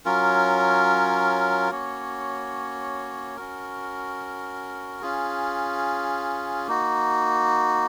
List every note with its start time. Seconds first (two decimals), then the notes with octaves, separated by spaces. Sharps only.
0.05 F#3 C#4 F4 A#4
1.71 A#3 C#4 F#4 C#5
3.36 C#4 F#4 A#4
5.02 C#4 F4 G#4
6.67 A#3 D#4 F#4